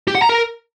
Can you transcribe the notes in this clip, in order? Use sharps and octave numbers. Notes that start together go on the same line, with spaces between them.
G4
F#5
A#5
A#4